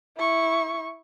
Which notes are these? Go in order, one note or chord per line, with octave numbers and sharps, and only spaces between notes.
E4 C#6